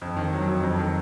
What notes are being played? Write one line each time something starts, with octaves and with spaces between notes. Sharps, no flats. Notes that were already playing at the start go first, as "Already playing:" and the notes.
F2
D#3
F#3
F2
F2
D#3